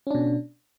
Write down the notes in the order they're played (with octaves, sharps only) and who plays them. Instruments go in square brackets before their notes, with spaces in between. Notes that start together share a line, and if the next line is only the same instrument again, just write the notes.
[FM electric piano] C#4
D4
B2